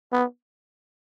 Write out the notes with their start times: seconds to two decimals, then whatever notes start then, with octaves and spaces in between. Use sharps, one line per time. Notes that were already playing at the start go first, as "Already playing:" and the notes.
0.12 B3